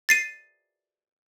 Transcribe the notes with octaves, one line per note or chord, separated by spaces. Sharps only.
A6 C7 D#7